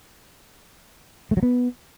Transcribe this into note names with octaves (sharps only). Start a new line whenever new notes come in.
A3
F#3
B3